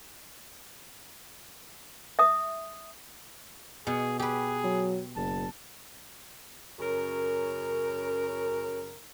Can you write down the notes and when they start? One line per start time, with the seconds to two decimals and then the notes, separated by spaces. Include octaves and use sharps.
2.19 E5 D#6
3.87 B2 G#4
4.19 G4 G#4 B4
4.64 F#3
5.16 F#1 A5
6.79 F#2 C#3 A#4